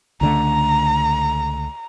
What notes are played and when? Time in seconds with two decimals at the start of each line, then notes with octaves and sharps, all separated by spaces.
0.21 C#2 D3 A3 A#5